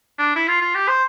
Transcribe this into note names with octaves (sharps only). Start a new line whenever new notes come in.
D4
E4
F4
F4
G4
C5